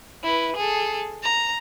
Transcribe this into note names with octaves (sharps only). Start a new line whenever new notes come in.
E4 B4
G#4 A4
A#5